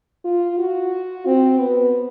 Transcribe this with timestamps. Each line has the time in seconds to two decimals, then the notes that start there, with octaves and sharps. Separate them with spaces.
0.25 F4
0.59 F#4
1.26 C4
1.59 B3